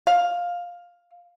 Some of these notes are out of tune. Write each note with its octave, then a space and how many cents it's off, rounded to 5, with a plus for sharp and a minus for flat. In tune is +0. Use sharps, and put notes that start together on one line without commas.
F5 +10